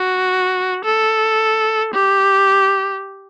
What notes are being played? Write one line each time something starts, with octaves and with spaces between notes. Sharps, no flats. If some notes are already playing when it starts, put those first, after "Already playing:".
Already playing: F#4
A4
G4